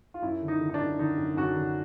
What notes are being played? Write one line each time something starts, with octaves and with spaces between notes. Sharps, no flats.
F4
F#2 E4
D3
D#4
D3
D#4
D4
F#2
D3 D#4
F#2
F#2 F#4
D3